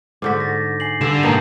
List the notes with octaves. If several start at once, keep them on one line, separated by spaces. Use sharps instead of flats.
G#2 D3 F#4 D6 G6 B6
A6 A#6
G#5 C7 F#7
G2 D3 A4 E7
G#2 D#3 A#3 B3 A5 A#5 G6